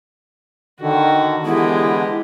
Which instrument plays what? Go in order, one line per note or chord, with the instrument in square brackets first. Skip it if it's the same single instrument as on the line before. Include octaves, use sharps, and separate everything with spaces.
[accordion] D3 D#3 [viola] F#4
[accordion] D3 E3 B3 [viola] G#3 G4 [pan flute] E4